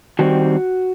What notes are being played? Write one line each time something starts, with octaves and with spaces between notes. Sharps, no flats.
D#3 G3 C4 F#4